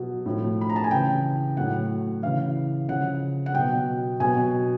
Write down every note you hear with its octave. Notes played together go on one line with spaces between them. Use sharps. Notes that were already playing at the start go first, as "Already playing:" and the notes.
Already playing: B2 F#3
A2 F3
B5
A#5
A5
G#5
C#3 E3 G5
A2 F#3 F#5
C#3 E3 F5
C#3 F3 F#5
F#5
B2 F#3 G5
B2 F#3 G#5